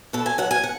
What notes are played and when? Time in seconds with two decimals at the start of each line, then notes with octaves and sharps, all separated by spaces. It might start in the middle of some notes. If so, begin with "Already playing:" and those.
0.13 B2 A4
0.26 G#5
0.38 F#3 F#5
0.51 G#5
0.64 F#5